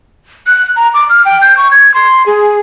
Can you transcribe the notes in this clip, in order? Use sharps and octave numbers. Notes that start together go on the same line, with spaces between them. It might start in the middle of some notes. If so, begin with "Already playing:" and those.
F#6
A#5
D6
F6
G5
G6
C#6
G#6
C6
G#4